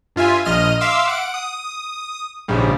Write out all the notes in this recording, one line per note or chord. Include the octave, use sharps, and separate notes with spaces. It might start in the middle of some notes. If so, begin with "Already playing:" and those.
G2 F4 E5 G#5
A#1 D#5 F6 D#7
E5 F5 C6 D6 E6
F#5 D7
D#6
A#1 G#2 C#3 G3